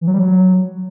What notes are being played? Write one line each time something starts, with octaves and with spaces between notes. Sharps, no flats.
E3
F#3
G3
F#3